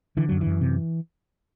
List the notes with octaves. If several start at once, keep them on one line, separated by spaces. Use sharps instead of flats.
D3 E3
F#2 F#3
E3
F#2
C3